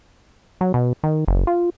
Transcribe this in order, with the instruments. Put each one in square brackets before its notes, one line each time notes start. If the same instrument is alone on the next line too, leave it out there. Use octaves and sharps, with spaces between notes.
[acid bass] F#3
B2
D#3
F#1
F4